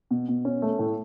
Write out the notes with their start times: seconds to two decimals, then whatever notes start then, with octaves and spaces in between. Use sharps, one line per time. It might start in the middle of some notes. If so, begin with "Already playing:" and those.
0.11 B2
0.28 B2
0.45 C#4
0.62 A3
0.79 A2